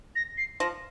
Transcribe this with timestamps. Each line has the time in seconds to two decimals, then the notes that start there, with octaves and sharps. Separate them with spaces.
0.16 A#6
0.38 C7
0.60 F3 A#6